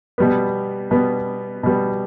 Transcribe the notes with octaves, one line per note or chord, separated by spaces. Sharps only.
B2 G3 B3
B2 G3 B3
B2 G3 B3